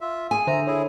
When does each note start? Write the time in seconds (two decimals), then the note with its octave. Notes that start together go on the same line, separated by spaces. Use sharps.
0.01 F4 E5
0.31 G#4 G#5
0.47 D3 C5 E5 A#5
0.67 E4 G#4 C#5